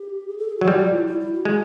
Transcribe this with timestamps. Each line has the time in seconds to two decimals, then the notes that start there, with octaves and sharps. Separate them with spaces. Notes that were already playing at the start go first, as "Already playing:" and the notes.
Already playing: G4
0.28 G#4
0.38 A4
0.48 G#4
0.57 F#3 F#4
0.68 G3
0.80 F4
0.93 E4
1.06 E4
1.20 E4
1.33 F#4
1.45 G#3